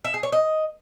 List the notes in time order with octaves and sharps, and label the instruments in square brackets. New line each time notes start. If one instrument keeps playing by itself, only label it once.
[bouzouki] E5
G#4
C#5
D#5